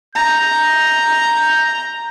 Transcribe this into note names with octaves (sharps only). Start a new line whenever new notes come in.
A#5 G6